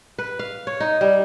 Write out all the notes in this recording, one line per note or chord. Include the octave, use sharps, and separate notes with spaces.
B4
F5
C#5
D#4
G3